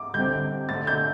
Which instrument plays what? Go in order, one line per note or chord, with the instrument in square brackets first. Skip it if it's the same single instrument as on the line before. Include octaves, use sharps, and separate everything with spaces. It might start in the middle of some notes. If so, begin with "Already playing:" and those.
Already playing: [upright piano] D6
[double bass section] D3 G3 C4 [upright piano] G6
[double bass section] D3 A3 C4 [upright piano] A6
[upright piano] G6